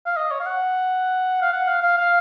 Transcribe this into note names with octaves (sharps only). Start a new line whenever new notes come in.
F5
D#5
C#5
F5
F#5
F5
F#5
F5
F5
F5